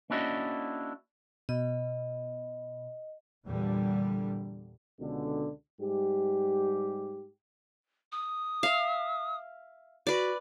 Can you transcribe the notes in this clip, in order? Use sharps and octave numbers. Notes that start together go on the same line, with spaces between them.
A#3 C#4 D4 E4 F#4 D#5
B2 D#5
E2 A#2 D3 G3
C#2 B2 D3
G#2 G3 G4
D#6
E5 F5
F#4 B4 D5